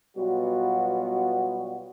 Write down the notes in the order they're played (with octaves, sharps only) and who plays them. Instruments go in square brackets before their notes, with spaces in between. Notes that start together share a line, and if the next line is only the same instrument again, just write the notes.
[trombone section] B2 F#3 G3 B3 F4 F#4